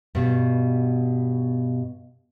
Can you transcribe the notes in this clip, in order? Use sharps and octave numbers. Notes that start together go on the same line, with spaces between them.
G2 B2